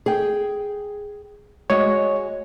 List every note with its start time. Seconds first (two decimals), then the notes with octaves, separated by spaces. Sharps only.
0.06 G#4 G5
1.70 G#3 F#4 C#5 D#5